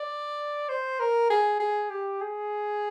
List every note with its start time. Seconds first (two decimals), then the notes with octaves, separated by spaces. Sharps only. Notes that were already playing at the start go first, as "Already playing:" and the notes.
Already playing: D5
0.69 C5
1.00 A#4
1.30 G#4
1.60 G#4
1.90 G4
2.21 G#4